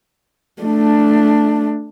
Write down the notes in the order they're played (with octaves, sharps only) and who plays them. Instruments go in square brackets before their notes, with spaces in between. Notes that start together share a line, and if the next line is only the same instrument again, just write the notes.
[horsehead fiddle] A3 D4